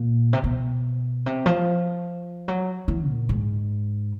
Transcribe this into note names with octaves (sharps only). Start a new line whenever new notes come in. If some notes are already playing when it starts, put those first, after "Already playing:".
Already playing: A#2
C3
B2
C3
F3
F#3
E3
A#2
G#2